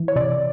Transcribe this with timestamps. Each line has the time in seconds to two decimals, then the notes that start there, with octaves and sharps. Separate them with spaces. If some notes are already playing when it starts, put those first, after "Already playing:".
Already playing: E3
0.08 C#5
0.16 C3 D5